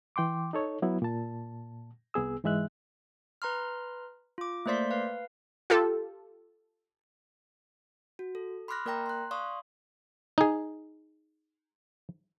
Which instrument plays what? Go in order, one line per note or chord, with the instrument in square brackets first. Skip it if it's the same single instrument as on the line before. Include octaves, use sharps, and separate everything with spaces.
[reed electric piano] E3 G5 C6 D6
D#4 A4 C#5
F#3 B3 E4
A#2 A5
C2 B3 G#4 E6
G#2 E3 G#3 E5 F#6
[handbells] B4 A#5 C6 F6
F4 D6
A3 A#3 C5 D5 C6 B6
B4 F5
[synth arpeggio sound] F4 G4 A4
[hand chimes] F#4
A4
B5 C6 D6 F6 F#6 A#6
A#3 A#4 D5 G5 A#5 A#6
C6 F#6
D5 F5 C6 C#6 D#6
[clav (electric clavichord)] D#4 G#4